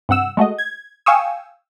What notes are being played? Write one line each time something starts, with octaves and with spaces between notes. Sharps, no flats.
G2 C3 F#5 E6
G#3 A3 F#4 D#5
G#6
F5 G5 G#5 C#6 D#6 E6